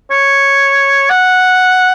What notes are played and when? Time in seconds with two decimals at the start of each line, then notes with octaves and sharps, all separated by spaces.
0.11 C#5
1.10 F#5